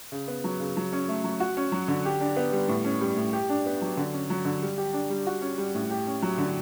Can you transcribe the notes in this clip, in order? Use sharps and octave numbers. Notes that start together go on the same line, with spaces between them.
C#3
B3
F#3
C#3
F#3
C#4
A3
F#3
F#4
C#4
F#3
D3
G4
D4
B3
G3
A2
C#4
G3
A2
G4
D4
B3
F#3
D3
C#4
F#3
D3
G3
G4
D4
G3
F#4
C#4
G3
A2
G4
C#4
F#3
D3